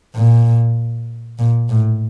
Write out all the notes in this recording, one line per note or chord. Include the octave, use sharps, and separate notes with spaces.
A#2
A#2
A2